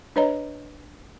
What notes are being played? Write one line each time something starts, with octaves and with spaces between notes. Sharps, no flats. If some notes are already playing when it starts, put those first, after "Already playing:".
D4 B4 C#5 D#5 A#5